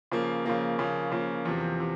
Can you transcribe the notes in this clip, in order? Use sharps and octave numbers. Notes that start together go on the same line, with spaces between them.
C#3 F3 A#3
C#3 F3 A#3
C#3 F3 A#3
C#3 F3 A#3
E2 C3 F3
C3